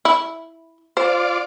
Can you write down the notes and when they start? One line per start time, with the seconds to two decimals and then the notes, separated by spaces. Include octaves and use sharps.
0.05 E4
0.97 F4 C5 D5